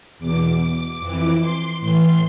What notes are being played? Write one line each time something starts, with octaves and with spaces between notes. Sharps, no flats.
E2 B2 D6
F2 E3
C6
A2 E3 C6